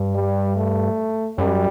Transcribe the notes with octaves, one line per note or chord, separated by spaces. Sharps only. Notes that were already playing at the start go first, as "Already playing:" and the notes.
Already playing: G2
G3
A3
F#2 G3